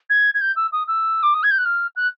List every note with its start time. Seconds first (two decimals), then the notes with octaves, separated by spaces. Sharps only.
0.09 G#6
0.34 G#6
0.41 G6
0.56 E6
0.72 D#6
0.87 E6
1.22 D6
1.34 D#6
1.43 G#6
1.50 G6
1.58 F#6
1.65 F6
1.96 F#6